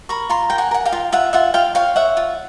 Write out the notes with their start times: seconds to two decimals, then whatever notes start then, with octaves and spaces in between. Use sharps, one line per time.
0.09 A#4 B5 C#6
0.29 F4 A#5 C6
0.50 A#4 G5
0.58 F#5 G#5
0.71 A#4 F#5
0.85 F5 G5
0.92 F4
1.12 F4 E5 F#5
1.33 F4 E5 F#5
1.54 F4 F5 G5
1.75 C#5 F5 G5
1.96 C#5 E5 F#5
2.17 F4